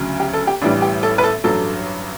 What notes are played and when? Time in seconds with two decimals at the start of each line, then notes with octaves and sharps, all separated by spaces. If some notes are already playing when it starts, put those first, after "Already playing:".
Already playing: D2 C#3 F#3
0.20 G4
0.33 A4
0.47 G4
0.61 A1 A2 E3 G3 D4
0.82 G4
1.03 A4
1.18 B4
1.24 A4
1.44 A1 G2 F#3 A4